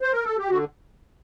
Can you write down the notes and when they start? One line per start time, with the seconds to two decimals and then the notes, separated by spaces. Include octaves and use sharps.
0.00 C5
0.12 A#4
0.24 A4
0.38 G4
0.50 D3 F#4